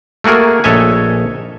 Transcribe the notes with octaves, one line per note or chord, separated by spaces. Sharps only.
A3 A#3 F#4 G#4 A#4
A#1 A4 C#5 D#5 E5 G#5